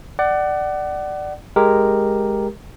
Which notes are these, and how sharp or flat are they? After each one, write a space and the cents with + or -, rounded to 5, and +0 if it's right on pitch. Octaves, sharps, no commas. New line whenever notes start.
D5 +15 F#5 +30
G#3 +0 G4 +5 A#4 +0